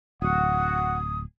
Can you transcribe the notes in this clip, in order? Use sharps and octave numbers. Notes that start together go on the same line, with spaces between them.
D1 F#4 F#5 D#6